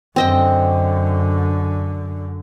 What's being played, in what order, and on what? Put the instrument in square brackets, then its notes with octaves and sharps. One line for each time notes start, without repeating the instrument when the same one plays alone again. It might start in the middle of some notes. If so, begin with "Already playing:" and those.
[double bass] F#2 D3 [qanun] C4 D#5 G5